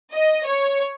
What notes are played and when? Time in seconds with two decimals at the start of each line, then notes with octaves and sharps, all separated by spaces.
0.12 D#5
0.46 C#5